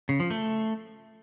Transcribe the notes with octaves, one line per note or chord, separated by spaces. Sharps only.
C#3
F3
A3